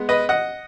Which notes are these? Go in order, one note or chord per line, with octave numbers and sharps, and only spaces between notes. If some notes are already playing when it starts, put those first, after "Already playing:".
Already playing: G#3 B3
B4 D#5
D#5 F#5